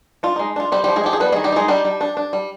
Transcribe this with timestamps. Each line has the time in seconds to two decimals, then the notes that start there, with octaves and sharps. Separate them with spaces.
0.23 D4 F4
0.36 G#3 D#4
0.56 D4 F4
0.72 G3 C4 G4
0.84 F3 G3 G4
0.96 G#3 G#4
1.04 F3 G4
1.13 G#4
1.20 G3 B3 B4
1.32 D#3 G#3 G#4
1.44 G3 G4
1.52 G#3 D#4 G#4
1.68 G3 D4 G4
1.85 G3
2.01 D4
2.17 D4
2.33 G3